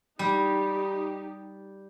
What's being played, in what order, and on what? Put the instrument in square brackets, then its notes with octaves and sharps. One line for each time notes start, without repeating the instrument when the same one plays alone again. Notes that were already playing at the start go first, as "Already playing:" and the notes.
[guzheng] G3 [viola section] D#4 G4